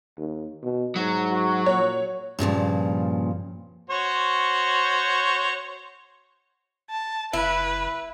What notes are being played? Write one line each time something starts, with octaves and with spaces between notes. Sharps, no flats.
D#2
B2
G#2 F#3
F#4
A#2 C#5
G2 A#2 C#3 F3
F#4 C5 C#5
A5
F#1 E4 B4